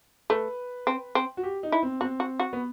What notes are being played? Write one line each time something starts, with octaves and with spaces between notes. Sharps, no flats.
A3 B4
C4
C4
F#4
G4
D#4
E4
C4
C4 F#4
F#4
F#4
B3